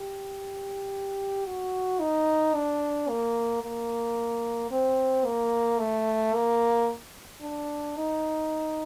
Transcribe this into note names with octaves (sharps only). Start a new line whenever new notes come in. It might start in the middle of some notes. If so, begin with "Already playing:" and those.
Already playing: G4
F#4
D#4
D4
A#3
A#3
C4
A#3
A3
A#3
D4
D#4